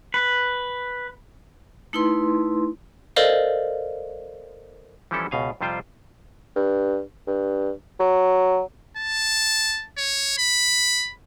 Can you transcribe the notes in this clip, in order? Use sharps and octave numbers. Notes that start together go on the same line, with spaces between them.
B4
A3 D#4 E4 B4 C6
A4 A#4 C5 D5 D#5 F5
E3 F3 G3 C#4 E4 A4
C#2 B2 F5 G#5
F2 C3 G3 F4 C5 G5
G2
G2
F#3
A5
C#5
B5